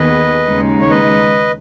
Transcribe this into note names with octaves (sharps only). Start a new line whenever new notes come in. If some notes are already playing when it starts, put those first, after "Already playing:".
Already playing: D#2 D#3 B3 G#4 B4 D#5
D#2 C#3 G#3 D#4
C#5
B4 D#5